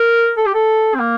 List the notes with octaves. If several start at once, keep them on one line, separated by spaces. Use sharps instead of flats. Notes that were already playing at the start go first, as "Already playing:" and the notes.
Already playing: A#4
A4
G4
A4
C4
A#3